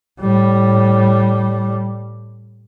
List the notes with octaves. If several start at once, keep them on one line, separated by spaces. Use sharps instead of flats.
A2 G3